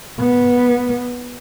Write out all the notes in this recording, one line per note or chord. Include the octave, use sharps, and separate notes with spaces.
B3